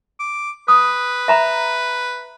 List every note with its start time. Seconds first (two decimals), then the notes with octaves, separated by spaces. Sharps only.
0.19 D6
0.68 B4 D#6
1.28 E5 A#5 B5